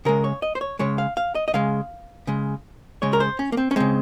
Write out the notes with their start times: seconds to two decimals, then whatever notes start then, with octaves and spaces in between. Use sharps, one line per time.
0.05 C#3 G#3 A#4
0.24 C#5
0.42 D#5
0.55 C5
0.61 C#5
0.79 C#3 G#3 C#5
0.98 F5
1.17 F5
1.35 D#5
1.48 D#5
1.54 C#3 G#3 F5
2.27 C#3 G#3
3.02 C#3 G#3 C#5
3.13 A#4
3.20 C5
3.39 C#4
3.52 A#3
3.57 C4
3.71 C#4
3.76 C#3 G#3 C4